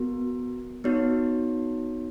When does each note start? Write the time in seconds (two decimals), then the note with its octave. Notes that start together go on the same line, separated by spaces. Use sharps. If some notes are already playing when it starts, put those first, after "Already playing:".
Already playing: B3 F#4 A#4
0.84 B3 D#4 F#4 C#5